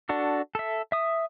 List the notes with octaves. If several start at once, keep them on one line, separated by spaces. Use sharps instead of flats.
D4 F#4 A4
A4 E5
E5 D#6